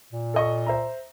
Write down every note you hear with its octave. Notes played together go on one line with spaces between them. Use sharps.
A#2
A4 D#5 C#6
C5 E5 A#5